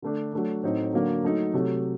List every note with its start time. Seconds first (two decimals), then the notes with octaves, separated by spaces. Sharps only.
0.02 D3 A3 D4
0.33 F#3 A3 D4
0.63 A2 F#3 C4 D#4
0.93 D3 F#3 A#3
1.23 F#3 A3 D#4
1.54 C3 F#3 A3